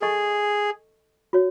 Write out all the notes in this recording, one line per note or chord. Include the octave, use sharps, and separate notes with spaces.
G#4 A4 D#5 A5 C#6
F#4 C#5